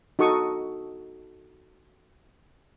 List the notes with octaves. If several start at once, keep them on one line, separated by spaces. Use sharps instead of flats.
D#4 F#4 A4 C#6 D#6